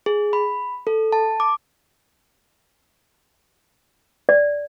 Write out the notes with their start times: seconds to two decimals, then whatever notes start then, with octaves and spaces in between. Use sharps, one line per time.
0.06 G#4
0.33 B5
0.87 A4
1.13 A5
1.40 D6
4.29 D5